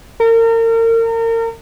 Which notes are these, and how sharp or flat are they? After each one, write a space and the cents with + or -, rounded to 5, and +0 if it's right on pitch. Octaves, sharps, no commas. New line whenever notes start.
A#4 -35